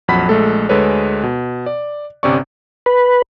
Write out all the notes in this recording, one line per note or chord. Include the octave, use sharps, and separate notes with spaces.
A#1 F2 F#3 F#5 B5 B6
A#1 G#3 A3 A4
D2 G#3 A4 B4 C#5
B2
D5
G1 C3 C4 C#4 D5 C#6
B4